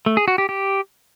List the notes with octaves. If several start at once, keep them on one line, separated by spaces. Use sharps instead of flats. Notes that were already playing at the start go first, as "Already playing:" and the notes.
A3
G#4
F#4
G4
G4